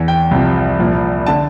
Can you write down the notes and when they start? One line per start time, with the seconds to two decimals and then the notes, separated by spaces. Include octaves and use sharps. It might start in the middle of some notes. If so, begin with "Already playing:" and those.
Already playing: E2 E3
0.08 G5
0.31 C2 C3 F3
0.79 C2 A#2 F3
1.26 D3 A5